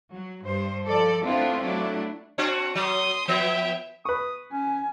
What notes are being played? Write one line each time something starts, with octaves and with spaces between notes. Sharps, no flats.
F#3
G2 C5
F3 A4 D5
A3 B3 C4 D4 E4 F4
F#3 A3 D4 E4
C4 D4 F#4
F#3 C6 D#6
F3 B3 E5 G5
B4 C#6 D#6
C#4 G#5